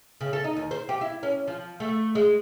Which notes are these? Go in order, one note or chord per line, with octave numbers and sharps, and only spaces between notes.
C#3
A4
D#4
D#2
C5
G4
E4
C#4
F3
A3
G#3